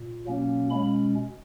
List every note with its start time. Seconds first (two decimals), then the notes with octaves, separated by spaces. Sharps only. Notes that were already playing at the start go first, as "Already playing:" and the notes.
Already playing: A#2
0.25 B2 F#3 A#3 C#4
0.70 B2 G#3 C#4 B5